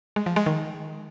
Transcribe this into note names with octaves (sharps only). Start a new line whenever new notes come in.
G#3
F3
G#3
D#3